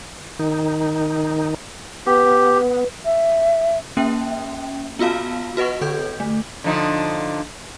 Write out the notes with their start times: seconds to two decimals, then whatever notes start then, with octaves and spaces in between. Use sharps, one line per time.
0.39 D#3 D#4
2.06 B3 G4 B4
3.05 E5
3.97 A#3 C#4 E5 G5
4.99 B3 F4 F#4 F5 A5
5.57 F#4 B4 D#5 F#5 C#6
5.81 D3 A4 G6
6.20 A3
6.64 D3 F3 D#4